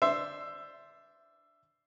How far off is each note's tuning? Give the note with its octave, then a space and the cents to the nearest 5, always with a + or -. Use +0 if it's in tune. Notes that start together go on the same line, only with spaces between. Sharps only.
D4 +0 C5 +0 E5 +15